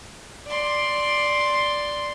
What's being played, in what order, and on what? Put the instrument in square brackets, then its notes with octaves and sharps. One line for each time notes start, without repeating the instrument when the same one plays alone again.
[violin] D5 C6